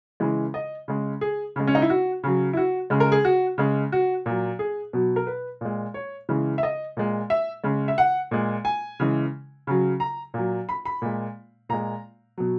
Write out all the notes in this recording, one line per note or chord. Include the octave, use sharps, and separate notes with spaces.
C#3 E3 G#3
D#5
C#3 G#3
G#4
C#3 G#3
C#4
D#4
E4
F#4
C#3 F#3
E4
F#4
C#3 G#3
A#4
G#4
F#4
C#3 G#3
F#4
A#2 F#3
G#4
B2 F#3
A#4
B4
A#2 G#3
C#5
C#3 E3 G#3
E5
D#5
A#2 G#3
E5
C#3 G#3
E5
F#5
A#2 G#3
G#5
C#3 E3 G#3
C#3 F#3
A#5
A#2 F#3
B5
B5
A#2 G#3
A#2 G#3 A#5
B2 F#3